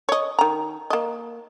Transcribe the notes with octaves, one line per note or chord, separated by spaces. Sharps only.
C#5 D#5
D#3 A#5
A#3 D#5